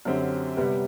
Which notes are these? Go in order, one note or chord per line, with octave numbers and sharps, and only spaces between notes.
F#2 D3 F#3 C4 G4
C3 G3 B3